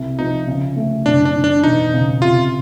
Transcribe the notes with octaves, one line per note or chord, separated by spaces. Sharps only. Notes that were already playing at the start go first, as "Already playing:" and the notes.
Already playing: C2
F3 D#4
C#3
A3
F#1 D4
D4
D#3
D4
E1 D#4
C#3
C3 F4